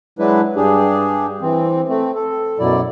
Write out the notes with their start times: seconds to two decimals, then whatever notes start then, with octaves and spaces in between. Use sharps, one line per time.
0.19 F#3 G#3 D4 E4 B4
0.56 G2 D4 G4 G#4
1.42 E3 C4
1.88 A3 C4
2.15 A4
2.59 F#2 B2 F#3 E4 D5